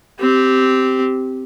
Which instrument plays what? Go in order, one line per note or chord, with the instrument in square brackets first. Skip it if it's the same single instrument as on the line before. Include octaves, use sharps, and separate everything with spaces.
[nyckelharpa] C4 G4